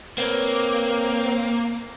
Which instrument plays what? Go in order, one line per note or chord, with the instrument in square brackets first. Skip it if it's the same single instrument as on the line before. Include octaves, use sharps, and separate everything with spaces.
[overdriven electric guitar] A#3 [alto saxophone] C4 [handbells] B4 C#5